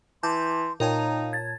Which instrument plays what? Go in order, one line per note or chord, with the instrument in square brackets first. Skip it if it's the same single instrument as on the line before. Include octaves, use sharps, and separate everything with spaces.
[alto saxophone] E3 [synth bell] A5 D6 G6 [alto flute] C6
[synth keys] A#2 C#5 A5 [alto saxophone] D#4 [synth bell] A#4 G5 A#5 [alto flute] F5
[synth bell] G#6 A6